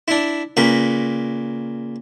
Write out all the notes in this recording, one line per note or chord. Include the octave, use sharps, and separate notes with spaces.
D4 E4
A#2 C#3 A#4 B4